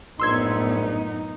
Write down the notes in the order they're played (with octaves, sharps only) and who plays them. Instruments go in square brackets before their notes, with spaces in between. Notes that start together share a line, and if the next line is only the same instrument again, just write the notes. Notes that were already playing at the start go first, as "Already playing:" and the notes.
[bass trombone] A#1 [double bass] F#2 D#4 [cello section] A2 B3 [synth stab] C6 E6 G#6